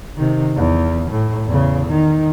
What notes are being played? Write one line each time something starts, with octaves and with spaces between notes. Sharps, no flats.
C3 D#3
E2
A2
E2 C#3
D#3